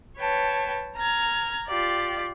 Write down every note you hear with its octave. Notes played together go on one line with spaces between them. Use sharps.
B4 C#5 G5 A5
A#5 F6 G#6
F4 G4 D5